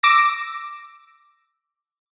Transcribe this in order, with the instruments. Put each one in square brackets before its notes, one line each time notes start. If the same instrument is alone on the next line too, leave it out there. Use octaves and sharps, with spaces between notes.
[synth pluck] D6 E6 A#6